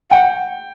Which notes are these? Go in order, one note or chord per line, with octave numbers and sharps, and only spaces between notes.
F#5 G5